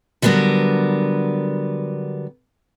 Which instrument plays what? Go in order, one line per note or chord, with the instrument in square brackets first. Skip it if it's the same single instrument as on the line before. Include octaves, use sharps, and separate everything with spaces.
[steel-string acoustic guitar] D3 F#3 G3 B3 A#4